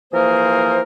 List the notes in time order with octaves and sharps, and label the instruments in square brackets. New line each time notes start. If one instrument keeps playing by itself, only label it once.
[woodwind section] E3 F3 A#3 G#4 A#4 C5